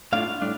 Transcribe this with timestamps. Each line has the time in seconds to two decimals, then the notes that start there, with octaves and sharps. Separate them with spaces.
0.13 A2 G3 D4 F4 F5
0.41 A2 G3 D4